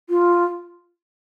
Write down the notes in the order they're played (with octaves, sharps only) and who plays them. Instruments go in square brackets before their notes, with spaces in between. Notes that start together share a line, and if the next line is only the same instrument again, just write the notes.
[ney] F4